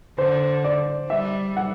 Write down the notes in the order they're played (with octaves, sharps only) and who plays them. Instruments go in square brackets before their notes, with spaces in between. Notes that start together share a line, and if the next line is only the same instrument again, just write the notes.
[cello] D3 [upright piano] C5
[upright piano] D5
[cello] G3 [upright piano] E5
[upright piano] F#5